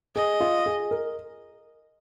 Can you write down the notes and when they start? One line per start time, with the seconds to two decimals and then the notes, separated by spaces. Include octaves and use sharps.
0.15 G#4 D#5
0.40 F4
0.66 G#4
0.91 A#4